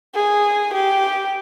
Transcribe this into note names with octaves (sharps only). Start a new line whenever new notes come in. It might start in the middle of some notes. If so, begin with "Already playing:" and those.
G#4
G4